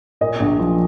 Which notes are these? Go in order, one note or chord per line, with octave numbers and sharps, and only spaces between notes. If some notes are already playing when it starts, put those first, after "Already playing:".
A#2 D#5
A#1
F3